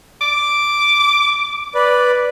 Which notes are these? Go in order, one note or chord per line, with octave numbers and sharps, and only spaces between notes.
D6
B4 D5